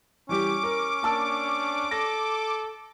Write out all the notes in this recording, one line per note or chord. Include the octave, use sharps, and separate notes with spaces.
E3 G3 C#4 G4 D6
A#4
A#3 D4 A5 E6
A4 A#6